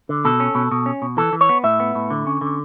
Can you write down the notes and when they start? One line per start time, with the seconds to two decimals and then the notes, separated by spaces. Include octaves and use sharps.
0.09 D3
0.25 B2 A4
0.40 C#4
0.55 B2
0.72 B2
0.86 C#4
1.02 B2
1.17 E3 A4
1.33 E3
1.41 C#5
1.49 B3
1.64 A2 E5
1.80 B3
1.95 A2
2.10 D3
2.27 C#4
2.41 D3